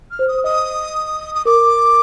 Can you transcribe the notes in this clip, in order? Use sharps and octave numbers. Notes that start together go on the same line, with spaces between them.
F6
C5
D#6
D#5 D#6
D#6
A#4 D6